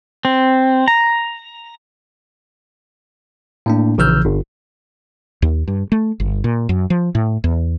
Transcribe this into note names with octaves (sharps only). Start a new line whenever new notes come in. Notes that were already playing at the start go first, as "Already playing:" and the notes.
C4
A#5
A2 A#3 D4
A#1 C#3 E3 E6 F6 G6
G1
D#2
G2
A3
G1
A#2
F#2
F3
A2
E2